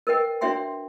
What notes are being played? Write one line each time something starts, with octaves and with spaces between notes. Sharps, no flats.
A#4 B4 D#5 G5
D4 F#4 C#5 E5 G5 C6